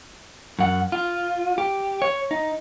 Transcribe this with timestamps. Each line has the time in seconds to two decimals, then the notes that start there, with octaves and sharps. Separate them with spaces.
0.59 F#2 F#5
0.92 F4
1.58 G4
2.02 C#5
2.31 D#4